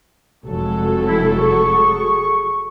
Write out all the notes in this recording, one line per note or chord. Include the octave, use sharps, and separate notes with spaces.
F1 F2 F#3 G#3 A4
E4
G#4 C#6